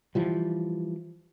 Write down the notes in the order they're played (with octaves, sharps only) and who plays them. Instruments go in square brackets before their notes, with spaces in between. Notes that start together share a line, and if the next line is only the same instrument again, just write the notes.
[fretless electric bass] E3 F3 G3